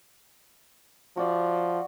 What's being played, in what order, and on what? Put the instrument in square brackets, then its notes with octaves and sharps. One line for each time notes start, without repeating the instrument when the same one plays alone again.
[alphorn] F3 [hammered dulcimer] F#4 D5 E5